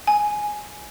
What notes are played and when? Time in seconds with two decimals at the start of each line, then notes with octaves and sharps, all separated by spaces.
0.07 G#5